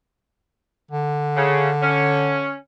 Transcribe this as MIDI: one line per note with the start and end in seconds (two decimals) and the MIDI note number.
0.91 2.58 50
1.36 1.68 49
1.82 2.54 61